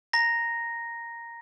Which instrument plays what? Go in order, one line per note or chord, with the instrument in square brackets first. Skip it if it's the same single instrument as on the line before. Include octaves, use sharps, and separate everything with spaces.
[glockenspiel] A#5 A#6